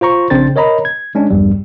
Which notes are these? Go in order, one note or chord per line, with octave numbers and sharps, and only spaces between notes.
F4 C5 A#5 C#6
A#1 C#3 C4 D4 C5 A6
A#4 C#5 D#5 A#5 B5
G#6
G#3 C#4 D4
A#1 E2 G2 G3